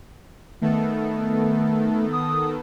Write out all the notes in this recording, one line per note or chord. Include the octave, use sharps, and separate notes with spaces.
D#3 A3 B3 A4
D#6